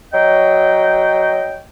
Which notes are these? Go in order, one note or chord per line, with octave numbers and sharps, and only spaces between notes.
F#3 D#5 G5